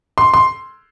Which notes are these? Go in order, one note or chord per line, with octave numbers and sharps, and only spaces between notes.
C6
C6